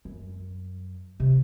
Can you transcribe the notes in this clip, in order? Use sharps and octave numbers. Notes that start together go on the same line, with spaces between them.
F#2
C3